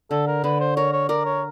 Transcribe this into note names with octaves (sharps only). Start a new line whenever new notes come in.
D3 A4
A#4
D3 B4
C5
A#4 C#5
C#5
A#4 D5
C#5